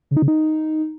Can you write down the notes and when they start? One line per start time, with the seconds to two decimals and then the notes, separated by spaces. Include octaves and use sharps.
0.11 C#3
0.17 D#4
0.22 C#3
0.28 D#4